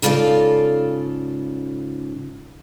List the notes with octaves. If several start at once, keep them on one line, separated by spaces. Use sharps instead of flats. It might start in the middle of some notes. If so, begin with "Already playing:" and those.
G#2 C#3 F4 A4 D5 F5